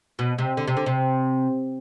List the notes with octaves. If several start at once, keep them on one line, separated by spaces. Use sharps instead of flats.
B2
C3
D3
C3
D3
C3